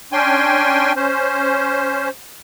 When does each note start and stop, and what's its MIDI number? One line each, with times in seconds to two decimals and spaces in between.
0.12 0.93 61
0.12 0.93 62
0.12 0.93 79
0.12 0.93 80
0.12 0.93 84
0.96 2.09 61
0.96 2.09 72